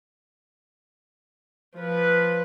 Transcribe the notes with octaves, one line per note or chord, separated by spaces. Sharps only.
F3 B4